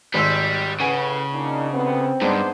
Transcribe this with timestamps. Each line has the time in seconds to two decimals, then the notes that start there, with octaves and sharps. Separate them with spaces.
0.14 G#1 G#2 G3 E6
0.80 A2 C#3 B4 F#5 G#5
1.32 A#2 D4 D#4
1.72 D2 C3 B3 C4
2.21 G2 G#3 B3 D4 D#4 C5